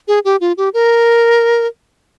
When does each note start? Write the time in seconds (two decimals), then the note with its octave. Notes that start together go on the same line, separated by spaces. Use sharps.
0.08 G#4
0.25 G4
0.41 F4
0.57 G4
0.74 A#4